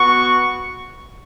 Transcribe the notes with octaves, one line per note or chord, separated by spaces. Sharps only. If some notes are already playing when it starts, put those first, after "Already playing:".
Already playing: B3 F#4 C#6